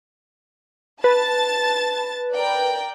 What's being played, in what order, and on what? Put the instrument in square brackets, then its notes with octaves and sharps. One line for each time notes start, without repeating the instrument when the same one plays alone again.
[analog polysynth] B4 [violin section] A5 A6
[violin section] A#4 D5 G5